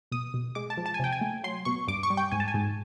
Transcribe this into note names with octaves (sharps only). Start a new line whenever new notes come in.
B2 D#6
B2
G#3 D6
A5
F3
A5
G#5
C3 G5
G#5
A3
F#3 C6
B2 C#6
G2 D6
C#6
G3
G5
G#2 G#5
A5
G#5
G#2